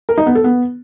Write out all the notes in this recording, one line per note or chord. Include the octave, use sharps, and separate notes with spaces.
A#4
D#4
B3
A4
B3